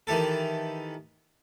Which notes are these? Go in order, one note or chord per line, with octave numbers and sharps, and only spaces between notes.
D#3 E3 G4 A4